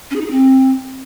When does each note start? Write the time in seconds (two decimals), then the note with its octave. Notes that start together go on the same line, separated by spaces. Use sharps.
0.11 C#4
0.16 G#4
0.21 D#4
0.26 G#4
0.31 C4